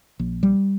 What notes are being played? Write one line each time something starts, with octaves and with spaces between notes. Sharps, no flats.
A#1
G3